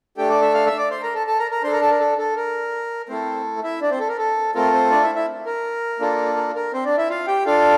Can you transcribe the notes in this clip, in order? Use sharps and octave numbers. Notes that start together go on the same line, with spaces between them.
A3 D4 G4 A4 G5
D5 D6
E5 E6
F5 F6
E5 E6
D5 D6
C5 C6
A#4 A#5
A4 A5
A4 A5
A#4 A#5
A#4 A#5
D4 A4 C5 C6
A#4 A#5
A4 A5
A#4
A4
A4
A#4
A3 C4 E4 A4 C5
E4 E5
D4 D5
C4 C5
A4
A#4
A4
A3 C4 F4 A4 A#4
C4 C5
D4 D5
E4 E5
E4 E5
A#4
A#3 D4 F4 A4
A#4
A#4
C4 C5
D4 D5
E4 E5
F4 F5
G4 G5
D4 F4 A4 F5